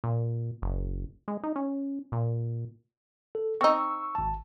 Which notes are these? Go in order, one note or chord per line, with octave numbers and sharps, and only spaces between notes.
A#2
F#1
G#3
D#4
C#4
A#2
A4
C4 D#4 C#6 E6
G#1 A5